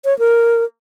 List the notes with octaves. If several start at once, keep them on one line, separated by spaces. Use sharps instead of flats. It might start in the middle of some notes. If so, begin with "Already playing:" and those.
C#5
A#4